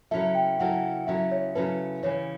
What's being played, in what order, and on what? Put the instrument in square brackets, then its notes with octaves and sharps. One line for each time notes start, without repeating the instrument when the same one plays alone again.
[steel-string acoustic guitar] C#3 F#3 C#4 E4 A4 [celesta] E5
[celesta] G5
[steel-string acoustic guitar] C#3 F#3 C#4 E4 A4 [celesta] F#5
[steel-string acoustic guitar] C#3 F#3 C#4 E4 A4 [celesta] E5
[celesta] C#5
[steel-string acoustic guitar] C#3 F#3 C#4 E4 A4 [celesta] B4
[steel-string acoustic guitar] C#3 E3 G3 C#4 [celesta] C#5